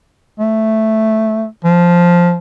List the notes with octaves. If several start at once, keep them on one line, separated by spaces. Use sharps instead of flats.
A3
F3